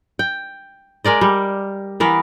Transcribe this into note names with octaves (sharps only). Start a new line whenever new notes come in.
G5
G#3 A#4 D5 D#5
G3
E3 B3 A#4